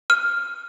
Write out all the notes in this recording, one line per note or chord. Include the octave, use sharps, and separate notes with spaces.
F6